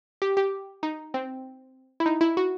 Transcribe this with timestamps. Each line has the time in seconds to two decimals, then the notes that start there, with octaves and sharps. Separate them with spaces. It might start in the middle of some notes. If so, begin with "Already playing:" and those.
0.22 G4
0.37 G4
0.83 D#4
1.14 C4
2.00 E4
2.06 D#4
2.21 E4
2.37 F#4